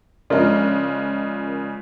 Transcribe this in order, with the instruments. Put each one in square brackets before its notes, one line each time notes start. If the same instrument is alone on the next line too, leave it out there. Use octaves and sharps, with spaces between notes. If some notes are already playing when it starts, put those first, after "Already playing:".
[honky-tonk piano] C#3 F3 G#3 [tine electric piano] A#4 D5